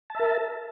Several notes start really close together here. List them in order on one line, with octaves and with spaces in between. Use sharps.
A5 E5 A#4